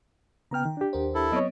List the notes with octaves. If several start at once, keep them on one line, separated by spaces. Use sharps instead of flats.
C#3 B3 G5 A#5 F6
D#3
D4 G4
D#2 A#4 C5
E4 A4
F#3 B3 C4 C#5 D#5